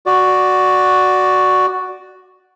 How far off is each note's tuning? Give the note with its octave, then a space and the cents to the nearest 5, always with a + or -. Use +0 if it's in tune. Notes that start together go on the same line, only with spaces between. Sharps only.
F#4 +0 D5 +0